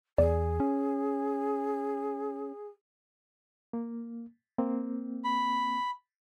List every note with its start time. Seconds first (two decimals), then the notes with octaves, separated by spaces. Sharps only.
0.18 E2 G#4 D5
0.60 C#4
3.73 A#3
4.58 A#3 C4
5.24 B5